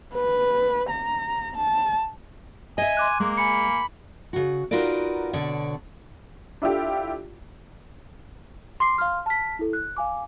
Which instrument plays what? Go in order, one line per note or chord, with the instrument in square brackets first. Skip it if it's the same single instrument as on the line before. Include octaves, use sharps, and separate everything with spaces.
[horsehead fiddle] B4
A#5
A5
[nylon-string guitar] D#5 E5 [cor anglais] G#5
[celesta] C6 D6 F#6
[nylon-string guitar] G#3 [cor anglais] A#3
[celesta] G#5 C#7 [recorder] B5
[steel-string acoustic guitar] C#3 F#4
D#4 F4 F#4 A#4 B4 D5
B2 D3 C#5 D5
[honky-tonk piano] D4 E4 F4 G4 A4
[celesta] C6 D6 C7
F5 C6 F6
A5 F6 B6
E4 A4
F#6
F5 G#5 D6